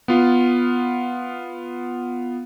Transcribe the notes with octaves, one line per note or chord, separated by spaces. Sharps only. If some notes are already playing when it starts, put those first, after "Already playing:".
B3 F4